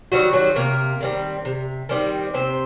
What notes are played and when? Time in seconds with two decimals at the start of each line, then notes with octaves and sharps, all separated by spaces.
0.12 D#3 F#3 G3 C4 F#4
0.33 F#3 F#4
0.56 C3 A#3 A#4
1.01 D#3 G3 C4
1.45 C3
1.89 D#3 G3 C4
2.34 C3 C4 C5